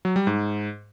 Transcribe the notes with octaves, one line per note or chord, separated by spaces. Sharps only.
F#3
G3
G#2